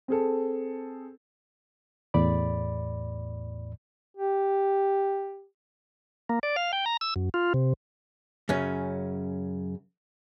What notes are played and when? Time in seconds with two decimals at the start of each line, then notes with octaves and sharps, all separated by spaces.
0.08 C4 G#4 A4
2.14 E2 A2 D5 B5
4.17 G4
6.29 A#3
6.43 D5
6.56 F5
6.73 G5
6.86 A#5
7.01 E6
7.16 F#2
7.34 F4
7.54 C3
8.49 F#2 C#3 C#4